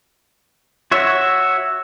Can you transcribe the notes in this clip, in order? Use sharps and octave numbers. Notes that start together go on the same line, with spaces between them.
F#4 C#5 E5